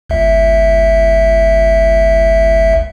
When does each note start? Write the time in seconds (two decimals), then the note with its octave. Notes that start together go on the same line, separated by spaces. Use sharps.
0.09 G1 C#2 E5